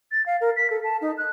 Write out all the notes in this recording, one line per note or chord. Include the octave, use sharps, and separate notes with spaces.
A6
F5
A#4
B6
A4
A5
D#4
F#6